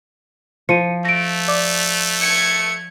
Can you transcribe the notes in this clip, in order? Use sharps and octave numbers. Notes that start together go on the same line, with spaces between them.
F3 C#7 D#7
A3 A#6 D7
D5 D6
G#6 C#7